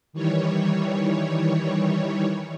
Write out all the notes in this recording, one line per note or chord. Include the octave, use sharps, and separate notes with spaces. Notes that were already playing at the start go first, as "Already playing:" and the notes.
D#3 E3 G3 C#5